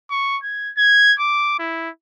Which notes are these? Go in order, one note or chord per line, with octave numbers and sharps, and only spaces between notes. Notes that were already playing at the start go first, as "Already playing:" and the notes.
C#6
G#6
G#6
D6
E4